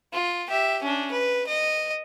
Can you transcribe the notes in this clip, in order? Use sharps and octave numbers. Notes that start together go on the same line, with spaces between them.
F4
G4 E5
C#4 D4
B4
D#5